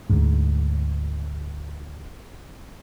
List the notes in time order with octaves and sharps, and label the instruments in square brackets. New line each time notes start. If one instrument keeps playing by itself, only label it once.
[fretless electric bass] D2 G#2